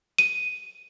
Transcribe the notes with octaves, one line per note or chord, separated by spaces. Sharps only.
D#7